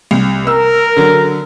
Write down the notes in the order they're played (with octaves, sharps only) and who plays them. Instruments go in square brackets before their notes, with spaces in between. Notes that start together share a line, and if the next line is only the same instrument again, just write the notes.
[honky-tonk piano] C2
[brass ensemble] A#4 [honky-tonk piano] E6
[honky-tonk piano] D3 F#3